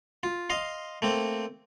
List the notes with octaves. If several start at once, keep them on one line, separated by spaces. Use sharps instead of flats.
F4
D#5 F5 C6
A3 A#3 C4